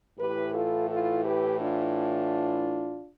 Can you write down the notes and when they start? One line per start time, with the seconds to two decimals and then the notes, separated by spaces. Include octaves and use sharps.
0.19 A2 E3 G4 B4
0.53 F4 A4
0.89 F4 A4
1.24 G4 B4
1.60 D4 F4